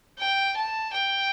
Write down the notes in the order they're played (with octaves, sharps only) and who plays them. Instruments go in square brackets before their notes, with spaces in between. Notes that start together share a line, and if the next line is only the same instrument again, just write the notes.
[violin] G5
A5
G5